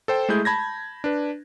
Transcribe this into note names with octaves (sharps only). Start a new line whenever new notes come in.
A4 C5 G5
G#3 A3 E4 G#4 G6
A5 B5 G#6 A#6
D4 B4